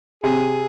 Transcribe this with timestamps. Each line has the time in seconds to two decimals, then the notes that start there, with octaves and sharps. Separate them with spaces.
0.24 C3 G#4